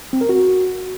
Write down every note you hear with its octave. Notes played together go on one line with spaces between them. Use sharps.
C4
A#4
F#4